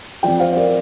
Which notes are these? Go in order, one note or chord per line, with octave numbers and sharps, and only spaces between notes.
F2 F3 D5 G5
C5 F5
C5
A#4 D5